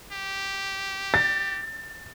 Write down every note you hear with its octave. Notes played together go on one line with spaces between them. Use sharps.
G4
A6